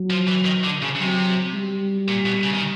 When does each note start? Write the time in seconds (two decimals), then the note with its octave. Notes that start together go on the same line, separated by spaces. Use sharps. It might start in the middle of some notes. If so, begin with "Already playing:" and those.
Already playing: F#3
0.10 F3
0.28 E3
0.46 D#3
0.64 D3
0.82 C#3
0.95 C#3
1.01 C3 F#3
1.54 G3
2.08 A#2
2.26 B2
2.44 C#3
2.54 D#3